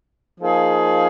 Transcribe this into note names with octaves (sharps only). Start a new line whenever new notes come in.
F3 A#3 D#4 G#4